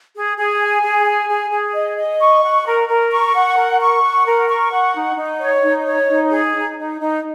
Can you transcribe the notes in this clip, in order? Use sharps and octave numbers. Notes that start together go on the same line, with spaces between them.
G#4
G#4
G#5
G#4
G#5
G#4
G#4
D#5
D#5
C#6
F#5
A#4
A#4
C#6
F#5
A#4
C#6
F#5
A#4
C#6
F#5
D#4
D#4
C#5
D#4
C#5
D#4
G#4
D#4
D#4
D#4